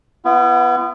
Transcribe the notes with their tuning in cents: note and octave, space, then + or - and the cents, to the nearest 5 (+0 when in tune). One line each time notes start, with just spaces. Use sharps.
B3 +5 E4 +45